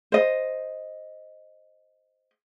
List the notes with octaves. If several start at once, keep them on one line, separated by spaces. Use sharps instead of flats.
C5 D#5